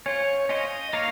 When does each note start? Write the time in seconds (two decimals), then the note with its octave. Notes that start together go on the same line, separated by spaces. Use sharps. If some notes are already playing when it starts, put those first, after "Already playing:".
0.06 C#4 F4 C5 C#5
0.49 C#4 F4 C5 D#5
0.93 A#3 D#4 A#4 C#5 F5